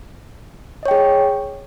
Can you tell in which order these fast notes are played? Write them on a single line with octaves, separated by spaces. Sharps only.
D#5 C#5 G5 G#4